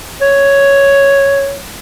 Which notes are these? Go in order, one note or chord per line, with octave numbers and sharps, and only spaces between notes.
C#5